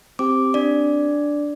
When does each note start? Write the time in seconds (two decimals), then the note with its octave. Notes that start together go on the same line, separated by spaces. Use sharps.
0.19 C4 G4 D6
0.54 D4 D5